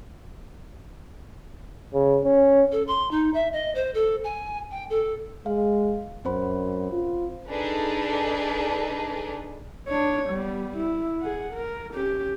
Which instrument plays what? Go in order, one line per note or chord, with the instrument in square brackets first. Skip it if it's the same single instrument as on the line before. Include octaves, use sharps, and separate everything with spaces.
[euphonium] C#3
C#4
[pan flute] A4
C6
D#4
E5
D#5
C5
A4
G#5
G5
A4
[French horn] G#3 [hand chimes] F5
[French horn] F#2 [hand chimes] C4 C5 B5
[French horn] F4
[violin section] D4 D#4 G#4 A4 B4
[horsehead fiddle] D4 C#5
G3 B3
E4
G#4 F#5
A#4
C#4 G4